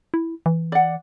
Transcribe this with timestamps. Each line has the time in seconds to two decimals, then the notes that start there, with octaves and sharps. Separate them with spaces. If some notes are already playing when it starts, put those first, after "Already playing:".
0.14 E4
0.46 E3
0.72 D5 F#5